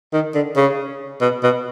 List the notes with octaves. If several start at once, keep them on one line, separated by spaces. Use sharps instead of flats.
D#3
D3
C#3
B2
B2